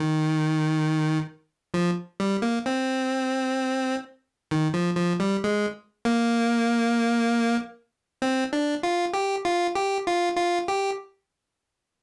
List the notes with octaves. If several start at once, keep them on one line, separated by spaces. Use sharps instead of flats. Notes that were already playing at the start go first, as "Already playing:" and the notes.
Already playing: D#3
F3
G3
A#3
C4
D#3
F3
F3
G3
G#3
A#3
C4
D4
F4
G4
F4
G4
F4
F4
G4